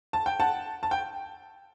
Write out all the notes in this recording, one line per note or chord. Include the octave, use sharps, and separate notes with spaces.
A5
G5
F#5 A5
A5
G5